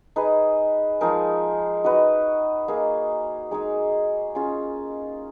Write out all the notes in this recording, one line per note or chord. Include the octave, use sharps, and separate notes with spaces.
D#4 G#4 B4
F3 G#3 D#4 A#4
D#4 F#4 B4 D#5
A#3 D#4 G#4
G#3 D#4 G#4
C#4 F4 G#4